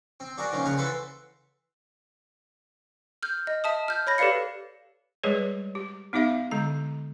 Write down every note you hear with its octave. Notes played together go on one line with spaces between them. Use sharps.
C4
D4 F#4 G#4 A#4
D#3 F3 A#3 C#4
C#3 F#5 G#5 A#5
E3 F#4 A4 B4 C5
F6 G6
D#5
E5 A5 D#6
F6 G6
C#5 B5 A#6
G4 A4 B4 D5 F5 C#7
G3 G#3 G#4 B4 C#5
G4
B3 D#4 G4 E5 F5
D3 G#3 A#5